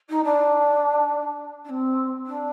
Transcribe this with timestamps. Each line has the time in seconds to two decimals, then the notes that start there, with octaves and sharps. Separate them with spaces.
0.09 D#4
0.24 D4
1.64 D4
1.69 C4
2.26 D4